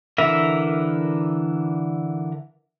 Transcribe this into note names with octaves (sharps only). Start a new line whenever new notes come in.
D3 E3 A#4 E5